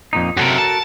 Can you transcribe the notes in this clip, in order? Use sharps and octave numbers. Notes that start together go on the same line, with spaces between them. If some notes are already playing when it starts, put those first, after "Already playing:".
F2 A#2 D#4
F#2 C3 F#4 A4 A#4
A5